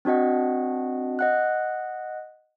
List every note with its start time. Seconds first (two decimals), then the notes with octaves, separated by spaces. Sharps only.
0.05 C4 D4 F#4 D#5 F#5
1.19 D#5 F#5 F#6